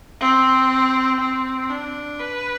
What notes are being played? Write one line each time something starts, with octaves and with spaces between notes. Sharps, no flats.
C4
C4
D4
B4